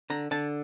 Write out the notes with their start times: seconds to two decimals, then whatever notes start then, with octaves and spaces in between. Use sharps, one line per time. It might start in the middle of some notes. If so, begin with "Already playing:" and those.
0.10 D3 A#5
0.31 D3 A5